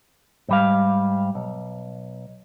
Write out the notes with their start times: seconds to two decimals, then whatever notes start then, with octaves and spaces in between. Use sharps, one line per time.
0.49 G#2 G3 F5
1.35 B1